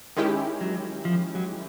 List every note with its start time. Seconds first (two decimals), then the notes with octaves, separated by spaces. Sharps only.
0.17 D#3 G#3 C#4 E4 G4
0.61 F#3
1.05 F3
1.35 F#3